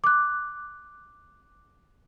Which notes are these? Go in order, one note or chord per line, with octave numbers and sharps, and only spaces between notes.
D6 F#6